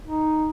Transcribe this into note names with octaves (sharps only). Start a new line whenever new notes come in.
D#4